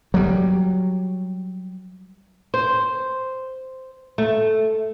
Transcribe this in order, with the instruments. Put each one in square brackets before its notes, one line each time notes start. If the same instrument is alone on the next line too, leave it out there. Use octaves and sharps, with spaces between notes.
[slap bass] F#3 G3
[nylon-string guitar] C5
A3